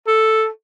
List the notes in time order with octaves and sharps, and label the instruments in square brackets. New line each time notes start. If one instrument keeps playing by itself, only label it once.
[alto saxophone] A4